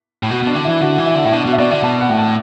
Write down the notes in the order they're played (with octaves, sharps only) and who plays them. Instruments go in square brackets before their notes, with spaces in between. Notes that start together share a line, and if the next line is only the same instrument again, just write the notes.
[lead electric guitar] A2
[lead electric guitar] B2 [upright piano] F#4
[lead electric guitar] B2 [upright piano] D4
[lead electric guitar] D3
[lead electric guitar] E3 [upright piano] E4
[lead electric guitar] D3 [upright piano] F#4
[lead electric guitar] E3
[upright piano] E4
[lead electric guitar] D3
[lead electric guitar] A2 [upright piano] E4
[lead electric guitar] B2 [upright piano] D4
[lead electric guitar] B2 [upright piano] F#4
[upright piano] E5
[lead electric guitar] B2 [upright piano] D5
[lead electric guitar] D3 [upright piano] E5
[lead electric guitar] B2 [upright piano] A5
[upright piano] F#5
[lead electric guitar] A2
[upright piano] A5